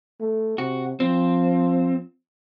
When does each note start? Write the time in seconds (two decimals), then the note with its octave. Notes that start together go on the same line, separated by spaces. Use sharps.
0.21 A3
0.58 C3 F#4
1.00 F3 C4